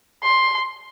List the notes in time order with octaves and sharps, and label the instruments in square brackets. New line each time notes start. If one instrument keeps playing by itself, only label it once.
[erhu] C6